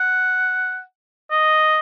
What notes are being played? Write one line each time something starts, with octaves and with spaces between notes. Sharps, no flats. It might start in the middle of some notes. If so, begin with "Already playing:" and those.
Already playing: F#5
D#5